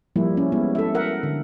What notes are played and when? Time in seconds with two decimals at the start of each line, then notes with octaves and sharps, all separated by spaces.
0.16 F3 G3 A#3 E4
0.37 C#4
0.52 G#3 B3 E4
0.75 A4 E5
0.95 A#4 E5 F#5
1.23 D3